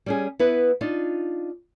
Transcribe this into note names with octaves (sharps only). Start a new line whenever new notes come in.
G3 C#4 G#4
B3 E4 B4
D4 D#4 F4